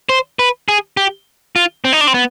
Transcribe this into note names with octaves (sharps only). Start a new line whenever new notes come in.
C5
B4
G#4
G4
F4
C4
D#4
D4
C4
B3